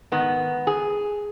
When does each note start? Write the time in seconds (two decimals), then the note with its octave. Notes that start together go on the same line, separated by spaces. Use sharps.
0.12 G#2 D#3 B3
0.67 G#4